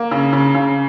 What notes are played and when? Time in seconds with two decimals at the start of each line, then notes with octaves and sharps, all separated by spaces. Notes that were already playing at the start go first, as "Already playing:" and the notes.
Already playing: A#3
0.11 C#3
0.33 C#3
0.55 C#3